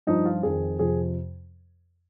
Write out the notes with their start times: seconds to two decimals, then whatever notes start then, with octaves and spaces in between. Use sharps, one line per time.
0.07 G2 F3 D#4
0.25 F4
0.43 F2 D#3 G#4
0.79 F2 C3 F3 G#4